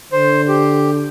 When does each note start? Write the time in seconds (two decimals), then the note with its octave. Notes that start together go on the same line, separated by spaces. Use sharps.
0.12 D3 C5
0.48 G4